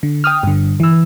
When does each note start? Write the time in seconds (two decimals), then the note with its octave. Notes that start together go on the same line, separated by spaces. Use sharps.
0.03 D3
0.24 G5 D#6 F6
0.43 G2 D3
0.80 E3 E6